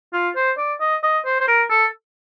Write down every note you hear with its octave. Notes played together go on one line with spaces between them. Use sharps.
F4
C5
D5
D#5
D#5
C5
C5
A#4
A4